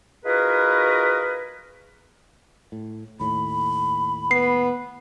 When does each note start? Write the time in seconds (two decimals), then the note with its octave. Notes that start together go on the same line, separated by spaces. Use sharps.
0.24 D#4 F4 F#4 G#4 A#4 B4
2.72 A2
3.20 D#2 A2 B5
4.31 B3 C7